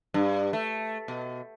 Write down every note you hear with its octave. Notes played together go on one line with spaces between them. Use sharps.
G2
A3
B2